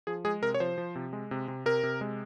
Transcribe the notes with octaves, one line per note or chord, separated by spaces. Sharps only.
F3 G#4
G#3 G#4
C3 A#4
C#5
F3 C5
F3
C3
G#3
C3
C3
C3 A#4
C3
G#3